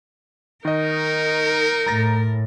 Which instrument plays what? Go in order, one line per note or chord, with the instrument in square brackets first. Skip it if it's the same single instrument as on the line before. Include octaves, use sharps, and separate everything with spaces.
[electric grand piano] D#3 D#5 [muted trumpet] D#4 [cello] A#4
[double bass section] A2 [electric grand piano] A#5 A6 A#6